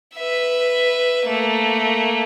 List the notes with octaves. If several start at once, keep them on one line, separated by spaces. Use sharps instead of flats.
B4 E5
A3 A#3